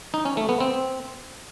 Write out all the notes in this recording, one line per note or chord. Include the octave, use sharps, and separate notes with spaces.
D#4
C#4
A3
B3
C4